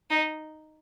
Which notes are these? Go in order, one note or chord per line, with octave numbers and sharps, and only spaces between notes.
D#4